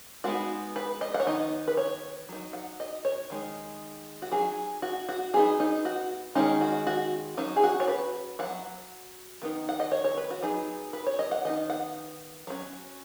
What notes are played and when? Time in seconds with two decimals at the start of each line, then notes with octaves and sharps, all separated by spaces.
0.24 G#3 B3 D#4 F#4
0.76 B4
1.01 D#5
1.14 F#5
1.20 C#5
1.26 D#3 B3 D#4 D#5
1.68 B4
1.77 C#5
2.29 F#3 D#4
2.53 F#5
2.80 D#5
3.05 C#5
3.30 D#3 G#3 D#4
4.22 F#4
4.32 F#3 D#4 G#4
4.82 F#4
5.09 F#4
5.34 F#3 B3 D#4 G#4
5.60 D#4
5.85 F#4
6.35 D#3 G#3 C#4 D#4
6.61 F#4
6.87 F#4
7.37 F#3 C#4 D#4
7.56 G#4
7.64 F#4
7.80 C#5
7.88 B4
8.39 F#3 C#4 F#5
9.42 D#3 B3 D#4
9.69 F#5
9.80 D#5
9.92 C#5
10.04 C#5
10.17 B4
10.31 F#4
10.42 F#3 B3 D#4 G#4
10.93 B4
11.07 C#5
11.19 D#5
11.31 F#5
11.45 D#3 B3 D#4 D#5
11.70 F#5
12.47 F#3 C#4